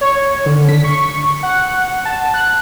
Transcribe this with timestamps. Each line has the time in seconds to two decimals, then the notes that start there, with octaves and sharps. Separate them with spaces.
0.01 C#5
0.46 D3
0.69 B6
0.84 C#6
1.43 F#5
2.05 A5
2.34 F#6